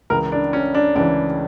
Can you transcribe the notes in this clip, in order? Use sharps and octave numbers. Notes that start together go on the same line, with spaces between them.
C#2 C#3 E3 A#4
D4
C#4
D4
C#2 C#3 E3 D4